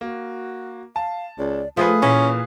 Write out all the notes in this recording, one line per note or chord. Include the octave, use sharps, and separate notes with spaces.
A#3 F#4
F5 A5
C#2 D5
F3 A3 F4 G#4 B4 D#6
A#2 E3 C#4